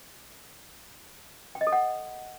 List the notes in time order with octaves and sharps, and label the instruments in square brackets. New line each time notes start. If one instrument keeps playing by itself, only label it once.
[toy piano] G5
D#5
A4
F#5